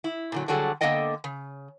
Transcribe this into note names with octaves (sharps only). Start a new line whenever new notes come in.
E4
A#2 D3 F#3
D3 F#3 G3 F#4 G#4 A4
D3 A#3 B3 A4 D#5 G5
C#3